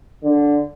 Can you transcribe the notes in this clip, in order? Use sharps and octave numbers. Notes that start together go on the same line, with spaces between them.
D3